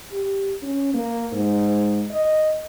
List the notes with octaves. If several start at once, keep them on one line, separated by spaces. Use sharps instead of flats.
G4
C#4
A#3
G#2
D#5